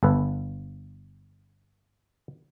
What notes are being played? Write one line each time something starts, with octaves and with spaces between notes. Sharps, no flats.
G1 A4 B4